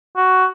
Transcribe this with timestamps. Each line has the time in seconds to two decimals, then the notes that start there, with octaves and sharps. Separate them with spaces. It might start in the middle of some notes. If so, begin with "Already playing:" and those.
0.17 F#4